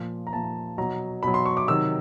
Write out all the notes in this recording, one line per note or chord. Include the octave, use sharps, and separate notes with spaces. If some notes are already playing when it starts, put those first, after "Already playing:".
Already playing: A#2 F3
A#5
A#2 F3 A5
B2 F#3 A#5
B2 F#3 B5
C6
C#6
D6
C3 D#3 F#3 E6